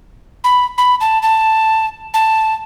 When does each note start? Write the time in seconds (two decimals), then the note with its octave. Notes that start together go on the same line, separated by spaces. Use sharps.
0.44 B5
0.78 B5
1.00 A5
1.22 A5
2.14 A5